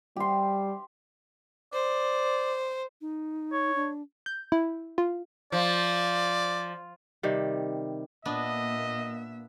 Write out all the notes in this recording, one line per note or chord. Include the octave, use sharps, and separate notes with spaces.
G3 G4 C6
C5 D5
D#4
C#5
D4
G6
E4
F4
F3 D5
C3 D#3 G3
A#2 A#3 B3 D4 D#5 E5